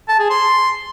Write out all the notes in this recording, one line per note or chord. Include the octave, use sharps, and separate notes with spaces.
A5
G#4
C6